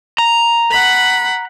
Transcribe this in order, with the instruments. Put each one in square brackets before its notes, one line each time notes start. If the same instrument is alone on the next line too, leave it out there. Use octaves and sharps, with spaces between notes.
[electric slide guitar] A#5
[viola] F#5 B5